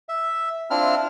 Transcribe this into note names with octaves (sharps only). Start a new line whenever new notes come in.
E5
C4 D4 E4 F4 F6